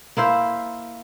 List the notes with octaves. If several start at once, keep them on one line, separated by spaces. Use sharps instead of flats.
A#3 E4 C5 E5